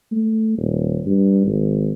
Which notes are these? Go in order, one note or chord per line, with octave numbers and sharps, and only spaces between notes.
A3
D#1
G2
G#1